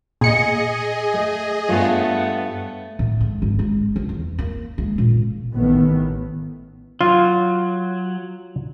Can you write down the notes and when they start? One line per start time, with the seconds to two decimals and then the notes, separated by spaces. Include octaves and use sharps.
0.21 A#2 G#4 D#5 C#7
1.14 A3
1.68 G2 A3 B3 F4 C#5
2.99 A2
3.21 G#3
3.42 G#1
3.59 G#3
3.96 C#2
4.09 E2
4.39 A#3
4.78 G#3
4.98 A#2
5.54 A1 A2 D#3 B3
7.01 F#3 F4